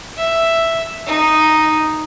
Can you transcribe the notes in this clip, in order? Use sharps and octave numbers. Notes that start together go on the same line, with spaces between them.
E5
D#4